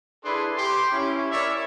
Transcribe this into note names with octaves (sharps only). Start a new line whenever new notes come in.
D4 E4 G#4 A4 B4 C6
G4 C6
C#4 E4
E4 A#4 C#5 D5 E5